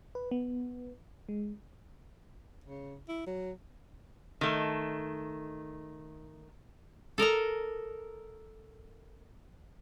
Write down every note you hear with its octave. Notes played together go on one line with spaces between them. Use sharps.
B4
B3
G#3
C#3
E4
F#3
D#3 A3
A4 A#4 D#5 A#5